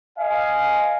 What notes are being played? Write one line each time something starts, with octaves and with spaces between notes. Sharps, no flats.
D#5 F5 G#5